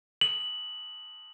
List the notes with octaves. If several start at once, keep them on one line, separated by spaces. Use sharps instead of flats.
F#7